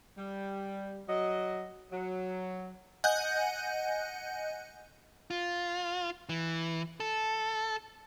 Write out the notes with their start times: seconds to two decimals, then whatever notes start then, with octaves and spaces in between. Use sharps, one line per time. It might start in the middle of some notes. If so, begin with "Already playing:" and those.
0.17 G3
1.09 F#3 D#5
1.92 F#3
3.04 D#5 F#5 G#5 F#6 G6
5.30 F4
6.29 E3
7.00 A4